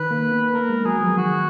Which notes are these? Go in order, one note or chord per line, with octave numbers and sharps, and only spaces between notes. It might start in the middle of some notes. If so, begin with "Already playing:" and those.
Already playing: D#3 B4
A#3
B3
A#3 A#4
G#3
F#3 G#4
F3
D#3 F#4